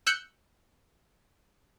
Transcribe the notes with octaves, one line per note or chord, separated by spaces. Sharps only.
E6 F#6 G6 C#7